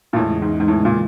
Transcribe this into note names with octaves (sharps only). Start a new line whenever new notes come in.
A#2
E2 A2 C#3 E3 G#3
G#2
G#2
A2
A#2